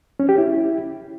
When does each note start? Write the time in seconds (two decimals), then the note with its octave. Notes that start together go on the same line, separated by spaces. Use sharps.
0.20 C#4
0.29 G4
0.38 E4